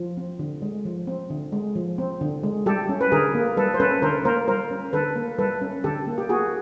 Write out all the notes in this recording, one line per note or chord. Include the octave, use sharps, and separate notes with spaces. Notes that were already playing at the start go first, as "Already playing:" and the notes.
Already playing: F3
C4
D3
G#3
F3
C4
D3
G#3
F3
C4
D3
G#3
G3 G4 A4
C#4
B4
D3 G#4 A#4
A#3
G3 A4 B4
C5
C#4 A4 B4
D3 A#4 C5
A#3 A#4 C5
G3 A#4 C5
C#4
D3 A4 B4
A#3
G3 A4 B4
C#4
D3 G4 A4
A#3
G4
A#3 F#4 G#4